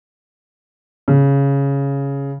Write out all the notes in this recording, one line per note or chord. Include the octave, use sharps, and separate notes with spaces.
C#3